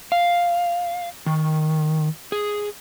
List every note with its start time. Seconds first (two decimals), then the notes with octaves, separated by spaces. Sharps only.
0.12 F5
1.26 D#3
2.32 G#4